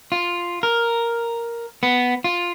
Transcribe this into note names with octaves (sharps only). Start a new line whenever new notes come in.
F4
A#4
B3
F4